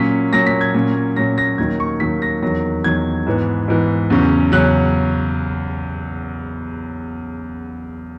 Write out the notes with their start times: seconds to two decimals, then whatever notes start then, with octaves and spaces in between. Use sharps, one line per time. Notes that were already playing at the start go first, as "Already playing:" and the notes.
Already playing: A#2 F#3 C#4 B6
0.33 A#2 F#3 C#4 A#6
0.46 B6
0.61 G#6
0.74 A#2 F#3 C#4
1.16 A#2 F#3 C#4 A#6
1.38 A#6
1.58 D#2 D#3 F#3 G#6
1.80 C#6
2.00 D#2 D#3 F#3 B6
2.22 A#6
2.42 E2 D#3 F#3 A#6
2.84 E2 D#3 F#3 G#6
3.27 G#2 E3 B3
3.68 G#2 E3 B3
4.10 E2 C#3 F#3 C#4
4.52 E2 C#3 F#3 C#4 F#6